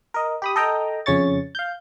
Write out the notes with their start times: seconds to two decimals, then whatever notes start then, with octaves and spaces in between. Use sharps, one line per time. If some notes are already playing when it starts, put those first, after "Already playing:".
0.14 A#4 D#5
0.42 G4 B5 D#6
0.56 A4 D#5 G5 A#5
1.06 F2 C#3 C#4 C#5 C#6 A6
1.55 F5 G6